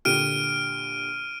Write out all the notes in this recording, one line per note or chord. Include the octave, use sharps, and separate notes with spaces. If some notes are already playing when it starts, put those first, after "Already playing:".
A#2 D3 G4 F6 D7 D#7